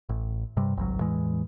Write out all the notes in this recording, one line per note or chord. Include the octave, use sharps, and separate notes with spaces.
A1
G2 C3 G3
G#1 C#2 F#3
E2 A2 E3 G#3